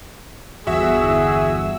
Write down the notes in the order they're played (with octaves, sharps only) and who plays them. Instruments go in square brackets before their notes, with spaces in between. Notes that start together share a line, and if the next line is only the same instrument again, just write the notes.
[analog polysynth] G1 E2 E6 [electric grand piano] F#4 E5 F#5 [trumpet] G#4